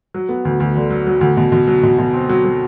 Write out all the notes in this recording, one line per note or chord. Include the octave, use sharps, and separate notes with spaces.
F#3
B3
D2
D2
D3
F#3
F#3
D2
B2
B2
F#3
B2
B2
C4
F#3
F#3